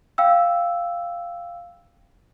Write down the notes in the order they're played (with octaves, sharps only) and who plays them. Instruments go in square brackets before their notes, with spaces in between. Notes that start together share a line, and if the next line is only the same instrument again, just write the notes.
[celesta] F5 G5 E6